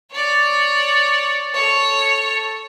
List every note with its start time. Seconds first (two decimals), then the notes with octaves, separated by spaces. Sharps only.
0.12 C#5 D5
1.53 A4 C#5